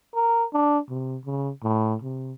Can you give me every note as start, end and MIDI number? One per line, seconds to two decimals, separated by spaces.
0.15 0.45 70
0.53 0.79 62
0.89 1.17 48
1.25 1.50 49
1.63 1.95 45
2.02 2.33 48